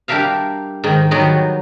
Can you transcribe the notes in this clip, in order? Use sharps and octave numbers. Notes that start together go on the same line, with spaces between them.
G3 D4 G4 A#4 E5 F5
G#2 D#3
D#3 F#3 G3 B3 D#4 F#4